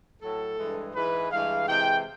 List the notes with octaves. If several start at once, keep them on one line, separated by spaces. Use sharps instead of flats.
A2 F#3 A4
G2 E3 G#3
G#2 E3 G#3 B4
G2 E3 G#3 F5
C3 E3 G#3 G5